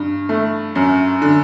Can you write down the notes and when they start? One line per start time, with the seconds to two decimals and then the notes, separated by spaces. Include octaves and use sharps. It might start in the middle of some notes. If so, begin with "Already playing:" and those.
Already playing: G2
0.29 A3
0.75 F#2
1.22 D3